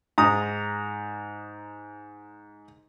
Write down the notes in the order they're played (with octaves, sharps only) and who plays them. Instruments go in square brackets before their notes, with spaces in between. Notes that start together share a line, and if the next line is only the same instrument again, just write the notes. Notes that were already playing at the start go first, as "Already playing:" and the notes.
[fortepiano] G#2 A#5 D#6